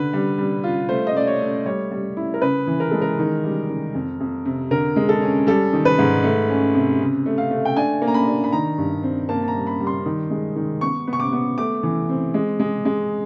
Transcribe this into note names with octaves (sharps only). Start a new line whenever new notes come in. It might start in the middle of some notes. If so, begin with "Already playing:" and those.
Already playing: D3 B4
G3
G3
F4
A3 C5
D#5
A3 D5
C#5
A3
G3 C#5
G3
E4
A#4
C#3 B4
E3
A#4
G#3 A4
A#4
D#3
G3
D#3
F2
F2
C3
D3 A#4
G#3
A4
C#4
G3 A4
D#3
B4
G#2
A3
C#4
C3
C#3
A3
F5
A3
G5
D4 G#5
A#3
A#5
B5
D4
B5
D#3 A#5
G2
C4
A#3 A5
A5
A#5
G3
B5
G3
C6
D#3
G#3
D#3
B3 C#6
B3
C#6
D6
B3
A3 D6
E3
C4
G#3
G#3
G#3